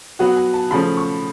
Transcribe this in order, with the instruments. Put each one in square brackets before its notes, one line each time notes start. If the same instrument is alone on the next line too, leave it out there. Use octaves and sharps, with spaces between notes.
[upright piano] F#3 B3 F#4 [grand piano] F#5
[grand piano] G#5
A5
[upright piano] C#3 F3 A3 C#4 G#4 [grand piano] B5
[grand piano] C#6